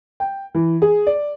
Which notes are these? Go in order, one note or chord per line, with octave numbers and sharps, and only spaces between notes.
G5
E3
G#4
D5